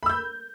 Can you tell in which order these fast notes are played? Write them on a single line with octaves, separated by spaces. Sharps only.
B5 E6 G6